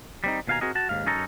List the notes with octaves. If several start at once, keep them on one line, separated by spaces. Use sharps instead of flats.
G3 C4 D#4
D#2 B2 F5 F#5 G#5 A#5
C4 F#4 G#4 A#4 D#5
F#4 A5
D#2 G#2 F5
F#2 C#4 D#4 A4 A#5